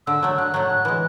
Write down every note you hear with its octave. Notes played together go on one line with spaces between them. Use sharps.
D3 E6
F#3 A3
D3 F#6
F#3 A3
A2
E3 G#3